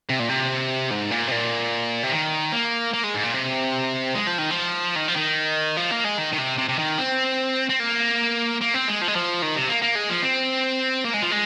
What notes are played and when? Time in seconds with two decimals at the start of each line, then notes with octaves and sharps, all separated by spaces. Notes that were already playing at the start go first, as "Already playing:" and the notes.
0.10 C3
0.19 A#2
0.29 C3
0.91 G#2
1.11 A#2
1.28 C3
1.31 A#2
2.04 C3
2.12 D#3
2.52 A#3
2.94 A#3
3.04 G#3
3.14 G#2
3.23 A#2
3.34 C3
4.15 G#3
4.27 F3
4.39 D#3
4.51 F3
4.96 D#3
5.08 F3
5.16 D#3
5.77 F3
5.91 A#3
6.04 G#3
6.18 D#3
6.32 D#3
6.38 C3
6.58 C3
6.69 C3
6.79 D#3
6.98 C4
7.70 C4
7.80 A#3
8.61 A#3
8.74 C4
8.88 G#3
9.01 F3
9.08 G#3
9.16 F3
9.42 D#3
9.56 C3
9.69 A#3
9.82 A#3
9.96 G#3
10.09 F3
10.23 C4
11.04 A#3
11.13 G#3
11.22 F3
11.31 G#3